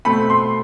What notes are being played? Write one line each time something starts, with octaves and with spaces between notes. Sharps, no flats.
B2 A3 C4 B5
C6